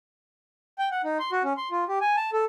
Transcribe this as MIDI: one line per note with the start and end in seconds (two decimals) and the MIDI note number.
0.79 0.89 79
0.91 1.02 78
1.04 1.18 63
1.19 1.31 84
1.32 1.43 66
1.44 1.53 61
1.57 1.69 84
1.71 1.84 65
1.88 1.99 67
2.01 2.16 80
2.16 2.30 81
2.33 2.45 69